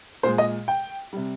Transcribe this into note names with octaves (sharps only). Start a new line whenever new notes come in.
A#2 G#3 C5
D#5
G5
C3 G3